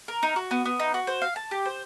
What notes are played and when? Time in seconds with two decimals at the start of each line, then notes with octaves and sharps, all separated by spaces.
0.08 A#4
0.23 D#4
0.36 F#4
0.51 B3
0.65 B3
0.80 D#4
0.94 F#4
1.07 C5
1.22 F5
1.36 A5
1.51 G4
1.66 C5